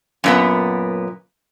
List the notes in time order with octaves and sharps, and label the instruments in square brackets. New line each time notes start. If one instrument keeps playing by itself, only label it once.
[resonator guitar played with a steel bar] F#2 A#2 B3